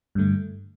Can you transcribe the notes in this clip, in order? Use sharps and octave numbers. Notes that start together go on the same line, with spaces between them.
G2 D3 A3